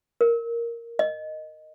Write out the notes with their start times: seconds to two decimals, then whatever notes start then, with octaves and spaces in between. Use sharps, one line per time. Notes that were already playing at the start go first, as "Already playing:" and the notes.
0.21 A#4
0.99 D#5